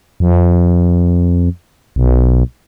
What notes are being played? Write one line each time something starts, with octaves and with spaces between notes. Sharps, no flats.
F2
B1